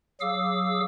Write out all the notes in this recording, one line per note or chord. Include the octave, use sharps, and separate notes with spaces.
F#3 G#4 F5 D6 E6